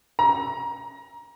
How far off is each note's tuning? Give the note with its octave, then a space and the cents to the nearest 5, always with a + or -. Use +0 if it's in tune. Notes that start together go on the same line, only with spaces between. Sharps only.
A#5 +25